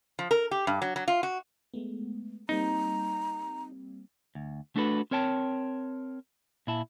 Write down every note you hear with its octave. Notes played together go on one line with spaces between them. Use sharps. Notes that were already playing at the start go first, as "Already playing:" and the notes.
F3
A#4
G4
G2
F#3
F#3
F4
F#4
G#3 A3 B3
G3 A#3 C4 D#4 A#5
D2
A3 D4 F#4 A4 B4
C4 A#4 C#5 G5 A5
A#2 E4 A5